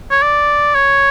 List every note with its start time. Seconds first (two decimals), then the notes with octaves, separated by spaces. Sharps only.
0.11 C#5
0.23 D5
0.75 C#5